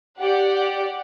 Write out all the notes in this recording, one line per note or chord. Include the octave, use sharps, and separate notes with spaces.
G4 D5 F#5